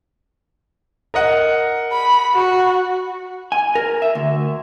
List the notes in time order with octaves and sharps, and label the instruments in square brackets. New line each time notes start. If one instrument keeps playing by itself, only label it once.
[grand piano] A#4 D#5 F#5
[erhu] B5
F#4
[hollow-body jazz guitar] G#5
A#4
E5
D2